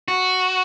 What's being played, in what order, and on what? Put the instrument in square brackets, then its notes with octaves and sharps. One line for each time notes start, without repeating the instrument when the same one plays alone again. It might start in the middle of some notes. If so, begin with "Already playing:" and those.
[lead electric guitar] F#4